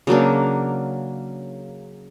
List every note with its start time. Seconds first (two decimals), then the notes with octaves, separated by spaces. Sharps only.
0.07 C#3 F#3 A#3 D4